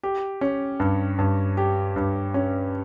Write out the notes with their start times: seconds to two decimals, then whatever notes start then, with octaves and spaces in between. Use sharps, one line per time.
0.03 G4
0.41 C#4
0.80 G2
1.19 G2
1.57 G4
1.96 G2
2.34 C#4